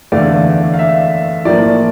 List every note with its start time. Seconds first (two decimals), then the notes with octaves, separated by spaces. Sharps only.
0.12 E2 D3 A3 D5 F5
0.74 F5
0.79 E5
1.45 A2 F3 A#3 D5